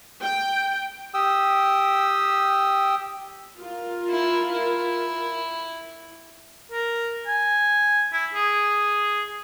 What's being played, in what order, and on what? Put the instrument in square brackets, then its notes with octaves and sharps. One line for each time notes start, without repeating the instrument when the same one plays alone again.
[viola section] G5
[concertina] G4 G5 D#6 E6
[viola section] F4 A#4
[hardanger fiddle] E4
E4
[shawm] A#4
G#5
E4
G#4